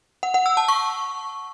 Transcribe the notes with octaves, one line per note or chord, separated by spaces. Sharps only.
F#5
F#5
E6
A5
C#6